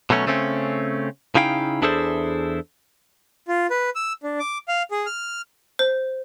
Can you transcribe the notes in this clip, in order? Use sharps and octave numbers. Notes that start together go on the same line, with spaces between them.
B2 F#3 A3 C#4
C#3 A3 C4 C#4
C#3 D#4 E4 F5 G5
E2 D4 E4 G#4 A4 C5
F4
B4
E6
D4
D6
F5
G#4
F6
C5